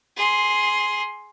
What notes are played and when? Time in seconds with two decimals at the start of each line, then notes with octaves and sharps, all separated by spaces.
0.17 G#4 C6